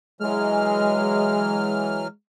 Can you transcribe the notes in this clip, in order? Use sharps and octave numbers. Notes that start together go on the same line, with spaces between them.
E3 F#3 G#3 F6